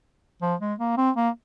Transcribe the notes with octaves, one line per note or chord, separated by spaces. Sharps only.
F3
G#3
A#3
C4
A#3